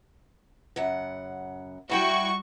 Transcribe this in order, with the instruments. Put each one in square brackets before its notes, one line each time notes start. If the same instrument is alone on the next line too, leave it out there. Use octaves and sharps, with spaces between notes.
[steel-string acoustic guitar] F#2 C#3 F#5
[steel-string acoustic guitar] A2 E4 G5 [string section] G3 F#4 C#6